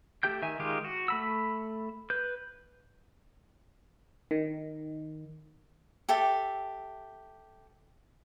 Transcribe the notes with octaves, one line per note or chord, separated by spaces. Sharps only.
A3 G4 G5 G6
D#3 E5 G#5
D#3 G#3 F4 G4
F#4
A3 B5 E6
B4 G6
D#3
G4 A4 E5